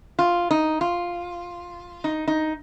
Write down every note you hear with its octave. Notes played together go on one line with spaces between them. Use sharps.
F4
D#4
F4
D#4
D#4